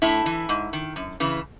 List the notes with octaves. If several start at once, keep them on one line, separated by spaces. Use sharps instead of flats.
A2 E4
E3
G#2
D#3
F#2
C#3 E3